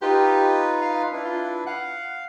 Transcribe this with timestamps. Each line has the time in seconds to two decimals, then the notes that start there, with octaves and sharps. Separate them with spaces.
0.02 D#4 F4 G4 B4
0.82 F5
1.12 D4 E4 B4
1.25 F4
1.67 F5 F#5